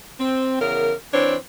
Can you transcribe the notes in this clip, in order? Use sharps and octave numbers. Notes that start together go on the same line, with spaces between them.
C4
E2 C#3 A#4
E3 C4 D4 C#5